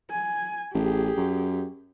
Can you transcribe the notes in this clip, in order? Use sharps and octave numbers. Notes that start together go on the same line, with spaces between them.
G#5
A1 G4 G#4
F#2